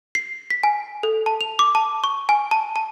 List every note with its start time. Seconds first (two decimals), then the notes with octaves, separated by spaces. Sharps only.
0.15 C7
0.50 B6
0.63 G#5
1.03 A4
1.26 A5
1.41 F7
1.59 D6
1.75 A5
2.04 C#6
2.29 G#5
2.51 A5
2.76 A5